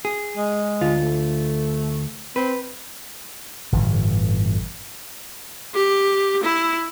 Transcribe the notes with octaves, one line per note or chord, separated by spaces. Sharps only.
G#4
G#3
D2 F4
A3
C4 B4
G1 A2 E3
G4
E4